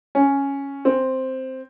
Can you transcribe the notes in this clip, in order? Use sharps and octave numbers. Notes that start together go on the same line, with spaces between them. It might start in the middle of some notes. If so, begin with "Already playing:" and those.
C#4
C4